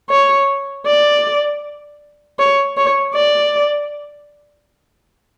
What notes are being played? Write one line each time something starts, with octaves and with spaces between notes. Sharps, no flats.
C#5
D5
C#5
C#5
D5